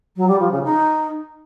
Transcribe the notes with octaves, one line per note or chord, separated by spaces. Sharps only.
F#3
G3
F3
C#3
D#4